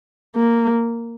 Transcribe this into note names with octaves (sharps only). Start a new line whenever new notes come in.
A#3